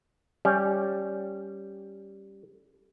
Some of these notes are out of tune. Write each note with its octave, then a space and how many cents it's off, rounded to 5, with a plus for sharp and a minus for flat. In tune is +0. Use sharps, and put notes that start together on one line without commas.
G3 +0 C#4 +0